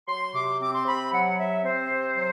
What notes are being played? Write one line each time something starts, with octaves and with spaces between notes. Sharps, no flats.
F#3 C6
C3 D6
C4 D6
C6
C3 B5
F#3 F#5
C3 E5
C4 C5
C3
F#3